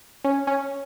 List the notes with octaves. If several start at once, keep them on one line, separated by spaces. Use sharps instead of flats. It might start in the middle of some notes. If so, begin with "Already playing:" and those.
C#4
C#4